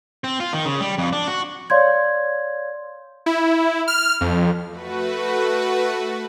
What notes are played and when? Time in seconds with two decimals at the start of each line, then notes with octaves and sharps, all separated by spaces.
0.24 C4
0.40 F4
0.54 D#3
0.65 C#3
0.80 G3
0.98 F2
1.13 D4
1.28 F#4
1.70 C#5 D5 F5 C6 G6 G#6
3.26 E4
3.88 F6
4.21 F2
4.69 A3 F#4 B4